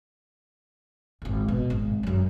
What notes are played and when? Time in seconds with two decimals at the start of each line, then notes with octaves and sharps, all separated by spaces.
1.22 G#1 F2
1.48 B2
1.70 G#1
2.03 F#2 F#3